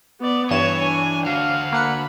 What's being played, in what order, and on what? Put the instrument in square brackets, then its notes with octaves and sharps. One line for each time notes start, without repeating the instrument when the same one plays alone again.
[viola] B3 D5
[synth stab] G2 E7 [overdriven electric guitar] E3 [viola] C#5
[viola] D4 [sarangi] G#5
[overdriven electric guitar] D3 F#4 [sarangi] F5
[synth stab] A#3 F#5 C#7 [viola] B5